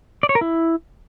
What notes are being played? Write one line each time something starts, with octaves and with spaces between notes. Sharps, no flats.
D5
C#5
A#4
E4